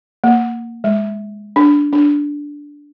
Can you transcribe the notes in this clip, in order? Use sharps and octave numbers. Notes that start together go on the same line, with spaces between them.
A#3
G#3
D4
D4